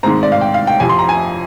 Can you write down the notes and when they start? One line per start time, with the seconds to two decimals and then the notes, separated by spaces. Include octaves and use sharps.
0.03 G#2 D#3 G#3 C4 A#5
0.23 D5
0.32 F5
0.41 G5
0.54 F5
0.67 G5
0.80 F2 C3 F3 G#5
0.89 C6
0.99 A#5
1.09 G#5